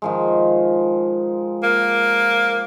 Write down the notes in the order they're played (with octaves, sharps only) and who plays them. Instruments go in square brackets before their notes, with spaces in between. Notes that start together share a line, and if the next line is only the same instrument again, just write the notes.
[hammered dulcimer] D#3 F3 G#3
[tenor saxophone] A#3